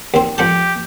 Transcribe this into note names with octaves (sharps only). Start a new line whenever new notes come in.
D#2 C4
F2 G4 F#5 A5